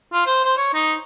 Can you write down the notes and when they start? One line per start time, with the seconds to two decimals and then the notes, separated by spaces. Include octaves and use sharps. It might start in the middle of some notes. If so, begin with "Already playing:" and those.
0.12 F4
0.26 C5
0.45 C5
0.57 C#5
0.74 D#4